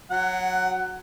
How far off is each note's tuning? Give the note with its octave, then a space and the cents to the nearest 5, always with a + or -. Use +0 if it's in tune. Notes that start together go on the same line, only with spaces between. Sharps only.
F#3 -10 F#5 +15